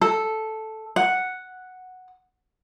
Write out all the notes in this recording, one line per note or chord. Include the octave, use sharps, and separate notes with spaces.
A4
F#5